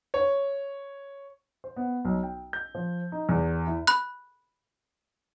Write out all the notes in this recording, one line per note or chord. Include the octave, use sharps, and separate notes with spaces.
C#5
C5
B3
B1
G5
G6
F3
D#4
E2
E4
B5 F#6